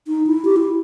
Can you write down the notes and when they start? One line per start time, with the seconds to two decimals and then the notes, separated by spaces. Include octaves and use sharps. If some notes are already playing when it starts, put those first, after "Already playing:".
0.08 D#4
0.27 E4
0.45 G4
0.56 E4